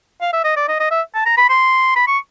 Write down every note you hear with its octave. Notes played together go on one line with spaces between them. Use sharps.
F5
E5
D#5
D5
D#5
D#5
E5
A5
A#5
B5
C6
B5
C#6